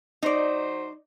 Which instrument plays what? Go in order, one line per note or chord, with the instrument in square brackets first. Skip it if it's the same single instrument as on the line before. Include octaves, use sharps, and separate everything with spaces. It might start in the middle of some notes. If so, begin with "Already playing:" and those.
[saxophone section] F#3 C5 [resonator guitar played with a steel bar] D#4 D5